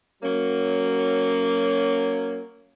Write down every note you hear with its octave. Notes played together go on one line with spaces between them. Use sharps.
F#3 A#3 C#4